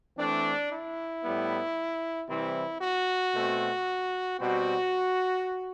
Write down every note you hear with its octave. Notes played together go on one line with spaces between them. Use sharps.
E3 A3 C4 D4
E4
A2 G3 B3
C3 E3 G3 C4 E4
F#4
B2 A3 C4
B2 G3 C4 F#4